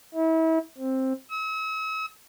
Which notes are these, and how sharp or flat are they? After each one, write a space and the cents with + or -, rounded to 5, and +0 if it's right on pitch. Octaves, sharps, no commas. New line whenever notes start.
E4 -35
C4 +10
E6 -45